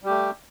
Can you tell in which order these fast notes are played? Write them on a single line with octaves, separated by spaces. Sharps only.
G3 G4 A3